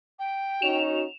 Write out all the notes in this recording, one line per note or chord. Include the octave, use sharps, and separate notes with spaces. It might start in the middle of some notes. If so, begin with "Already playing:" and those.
G5
C#4 D#4 F#4 E7 F7